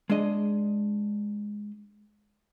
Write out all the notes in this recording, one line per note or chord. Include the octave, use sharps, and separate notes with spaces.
G#3 D4 D#5